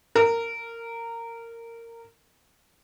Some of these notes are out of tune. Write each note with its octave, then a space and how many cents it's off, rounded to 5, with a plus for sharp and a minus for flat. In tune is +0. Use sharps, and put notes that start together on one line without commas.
A#4 -15